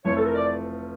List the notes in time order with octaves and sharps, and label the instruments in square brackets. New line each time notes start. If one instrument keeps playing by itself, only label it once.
[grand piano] F1 F2 E3 A3 [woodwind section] C#5
[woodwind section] A4
A#4
D5